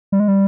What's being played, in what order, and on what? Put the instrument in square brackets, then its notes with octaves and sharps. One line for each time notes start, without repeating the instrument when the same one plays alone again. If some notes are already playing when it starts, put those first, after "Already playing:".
[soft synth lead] G3
G#3
G3